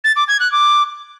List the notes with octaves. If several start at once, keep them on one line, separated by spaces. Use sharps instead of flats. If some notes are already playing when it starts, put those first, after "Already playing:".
A6
D6
G#6
F#6
D6